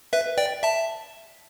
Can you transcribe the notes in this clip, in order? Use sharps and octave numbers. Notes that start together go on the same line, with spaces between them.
B4 E5
D5 G5
E5 A5